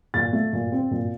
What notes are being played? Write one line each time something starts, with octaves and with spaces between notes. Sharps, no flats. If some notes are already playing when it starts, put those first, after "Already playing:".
A#2 A6
A3
A#2
C4
A#2